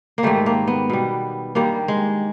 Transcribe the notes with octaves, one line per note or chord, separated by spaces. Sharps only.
A#3
G#2 D#3 G3 A3
A#3
B3
B2 G3
G2 D#3 G3 A#3
G#3